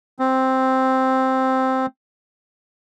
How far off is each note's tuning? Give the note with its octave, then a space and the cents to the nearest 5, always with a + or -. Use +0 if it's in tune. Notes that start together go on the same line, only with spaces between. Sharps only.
C4 +0